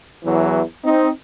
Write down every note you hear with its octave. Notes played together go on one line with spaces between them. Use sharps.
E2 E3 F#3
C4 D#4